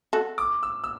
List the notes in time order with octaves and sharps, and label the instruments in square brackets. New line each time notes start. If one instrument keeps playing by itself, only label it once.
[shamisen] F#4 A4
[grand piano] D6
E6
E6